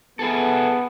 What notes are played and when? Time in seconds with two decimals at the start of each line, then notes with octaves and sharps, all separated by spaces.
0.19 B3 E4 G#4 A4